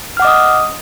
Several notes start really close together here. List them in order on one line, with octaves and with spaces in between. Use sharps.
F6 F#5 D6 D#5 D#6